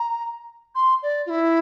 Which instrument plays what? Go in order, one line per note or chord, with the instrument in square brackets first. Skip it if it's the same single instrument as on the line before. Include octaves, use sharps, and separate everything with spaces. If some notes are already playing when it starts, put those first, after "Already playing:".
Already playing: [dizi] A#5
C6
D5
F4
E4